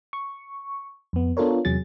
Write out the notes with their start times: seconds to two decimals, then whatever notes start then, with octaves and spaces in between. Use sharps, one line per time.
0.13 C#6
1.13 F2 B3
1.37 B3 D4 F4 A4 A#4 C#5
1.65 E2 C3 F#3 G#4 A6